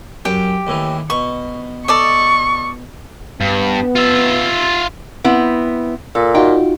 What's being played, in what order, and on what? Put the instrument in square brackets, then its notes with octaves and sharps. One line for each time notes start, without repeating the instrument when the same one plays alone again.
[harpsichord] F#2 [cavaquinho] G4
[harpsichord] D#2 A2 E3
[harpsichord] B2 [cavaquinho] C#6
[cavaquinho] A4 D5 D#5 [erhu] C#6
[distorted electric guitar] G2 [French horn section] B3
[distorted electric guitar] F4 E5
[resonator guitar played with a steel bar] B3 C4 E4
[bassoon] A#2 [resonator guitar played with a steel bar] A4
[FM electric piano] D#4 F4 F#4 [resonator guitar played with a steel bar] G5